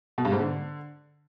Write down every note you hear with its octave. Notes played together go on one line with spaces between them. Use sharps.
B2
G2
G#2
D3